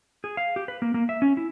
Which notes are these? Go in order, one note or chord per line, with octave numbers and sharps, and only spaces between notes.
G#4
F5
G4
B4
A#3
A#3
E5
C#4
E4